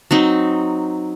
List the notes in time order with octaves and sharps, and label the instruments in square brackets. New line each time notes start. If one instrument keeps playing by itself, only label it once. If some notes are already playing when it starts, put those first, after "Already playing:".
[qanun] F#3 C4 D#4